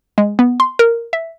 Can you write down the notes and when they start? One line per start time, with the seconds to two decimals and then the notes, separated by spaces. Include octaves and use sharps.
0.18 G#3
0.39 B3
0.60 C6
0.79 A#4
1.13 E5